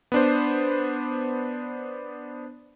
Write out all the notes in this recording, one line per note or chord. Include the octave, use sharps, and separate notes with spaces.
B3 D4 C5